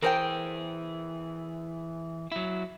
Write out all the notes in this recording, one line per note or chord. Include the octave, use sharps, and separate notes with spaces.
E3 G#4 A#4 C5 G5
F#3 E4